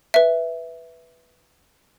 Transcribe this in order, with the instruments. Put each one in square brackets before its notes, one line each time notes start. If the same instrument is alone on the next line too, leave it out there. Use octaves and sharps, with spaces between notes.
[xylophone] B4 E5